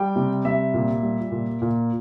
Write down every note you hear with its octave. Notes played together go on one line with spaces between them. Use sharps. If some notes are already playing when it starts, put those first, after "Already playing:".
Already playing: G3 G5
C3
G3 E5
A#2
G3
A#2
A#2